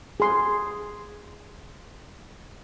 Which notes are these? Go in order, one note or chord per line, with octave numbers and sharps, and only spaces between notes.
G#4 C6